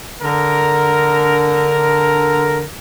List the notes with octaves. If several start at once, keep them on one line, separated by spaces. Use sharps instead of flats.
D3 A#4